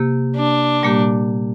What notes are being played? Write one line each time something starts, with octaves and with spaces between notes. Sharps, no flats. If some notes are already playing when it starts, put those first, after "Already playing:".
Already playing: C3 A#3 G4
D4
A#2 G3 A#3 G4